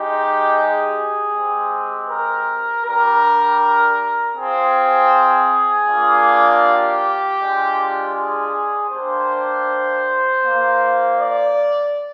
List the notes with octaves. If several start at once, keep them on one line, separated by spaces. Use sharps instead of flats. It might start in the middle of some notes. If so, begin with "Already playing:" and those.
Already playing: G#3 D#4 G4
G#4
G#3 C4 G4
A#4
G3 D4 G4 A#4
C4 F4 G#4
A#3 D4 F4
G4
G#3 D4 F4
G#4
A#3 D4 G4 C5
A#3 F4
D5